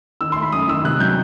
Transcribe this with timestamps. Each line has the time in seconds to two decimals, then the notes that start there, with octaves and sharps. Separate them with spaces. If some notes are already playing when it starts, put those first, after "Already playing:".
0.21 D#3 E6
0.32 A3 C6
0.42 B5
0.52 F#2 D#6
0.68 D#3 E6
0.84 C3 F#6
1.00 F#3 G6